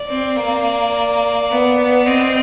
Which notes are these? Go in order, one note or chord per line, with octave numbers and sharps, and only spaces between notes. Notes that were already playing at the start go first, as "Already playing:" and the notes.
Already playing: D5
C4
A#3
B3
C4 D#5